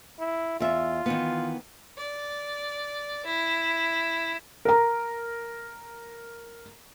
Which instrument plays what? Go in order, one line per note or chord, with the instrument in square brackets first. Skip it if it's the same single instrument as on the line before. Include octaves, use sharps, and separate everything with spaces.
[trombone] E4
[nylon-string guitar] E2 E5 [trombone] F4
[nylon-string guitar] D#3 E3 B3
[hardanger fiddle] D5
E4
[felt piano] A#4 A#5